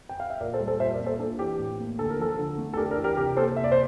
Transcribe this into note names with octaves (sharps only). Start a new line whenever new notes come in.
G5
F5
E5
A#2 A#4 D5
A4 C5
G3
A4 C5
A#2 C5 E5
A#4 D5
A#3
A4 C5
D4 A4
E3 G4
A2
A#3
D3 A4
A#4
F3 A4
D3
A3
A4
D4 G4 A#4
A#4 D5
E3
G4 A#4
C3 G4 A#4
A#3 A4 C5
C3 E5
D5
C5